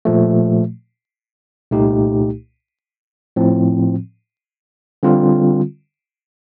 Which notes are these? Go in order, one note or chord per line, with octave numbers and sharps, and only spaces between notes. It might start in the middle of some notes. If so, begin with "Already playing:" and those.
A#2 F3 A3
C2 A#2 A3 D#4 G4
A2 F3 C4
D3 G3 C4 F4